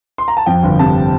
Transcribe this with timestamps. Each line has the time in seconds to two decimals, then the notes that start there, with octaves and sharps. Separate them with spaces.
0.18 C6
0.28 A#5
0.37 A5
0.46 F2 G5
0.63 G1
0.79 C3 A5